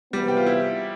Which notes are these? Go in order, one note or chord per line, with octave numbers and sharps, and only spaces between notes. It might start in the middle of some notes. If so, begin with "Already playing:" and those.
E2 C3 E3 G3 B3
G4
F4
E4